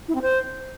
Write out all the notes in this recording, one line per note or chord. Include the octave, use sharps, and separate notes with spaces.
E4
C4
C5